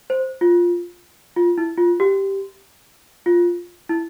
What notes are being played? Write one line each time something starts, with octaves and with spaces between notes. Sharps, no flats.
C5
F4
F4
E4
F4
G4
F4
E4